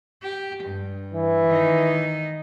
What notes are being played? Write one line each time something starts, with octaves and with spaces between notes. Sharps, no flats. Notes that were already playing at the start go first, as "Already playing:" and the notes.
G4
G2
E3
D#3 D#4